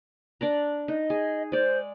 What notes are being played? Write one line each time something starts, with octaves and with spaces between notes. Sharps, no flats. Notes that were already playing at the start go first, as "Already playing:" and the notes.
D4 D5 A#5
D#4 D#5
G#4
G#3 C5 D5